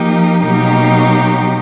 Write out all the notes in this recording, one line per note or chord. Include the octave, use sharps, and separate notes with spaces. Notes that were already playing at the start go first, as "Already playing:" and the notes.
Already playing: F3 A#3 D#4 G4
B2 F#3 A#3 D#4 G4